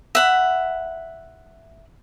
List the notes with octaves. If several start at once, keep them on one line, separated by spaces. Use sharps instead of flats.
E5 F#5 B5